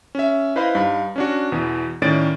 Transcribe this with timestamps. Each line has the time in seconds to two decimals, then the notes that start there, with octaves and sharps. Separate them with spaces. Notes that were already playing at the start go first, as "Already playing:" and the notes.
0.15 C#4 E5
0.56 E4 B4 C5 D#5 F5 B5
0.75 G2 D#4 F5 B5
1.16 C#4 D4 F#4
1.52 E2 B2 E3
2.02 A2 D#3 C#4 D5 A6 D7